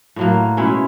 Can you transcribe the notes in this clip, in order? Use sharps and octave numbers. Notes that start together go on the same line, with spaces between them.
A2 F#3 A#3
B2 G#3 C#4 E4